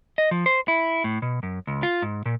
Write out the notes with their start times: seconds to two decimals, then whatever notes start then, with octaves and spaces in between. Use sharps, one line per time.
0.18 D#5
0.31 F3
0.46 C5
0.68 E4
1.04 A2
1.22 B2
1.43 F#2
1.67 C#2
1.83 F4
2.02 G#2
2.26 A#2